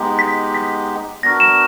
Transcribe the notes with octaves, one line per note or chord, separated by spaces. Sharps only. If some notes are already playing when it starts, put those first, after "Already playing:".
Already playing: G#3 B3 D#4 G4
B6
B6
B3 D4 F#4 A#4 A#6
E7